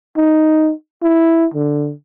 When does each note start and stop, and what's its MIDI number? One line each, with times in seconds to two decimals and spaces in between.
0.17 0.72 63
1.03 1.47 64
1.54 1.93 50